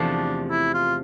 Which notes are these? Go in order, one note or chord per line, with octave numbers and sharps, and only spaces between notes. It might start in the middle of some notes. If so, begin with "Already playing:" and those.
Already playing: E2 C3 F3 A3 D4
E4
F4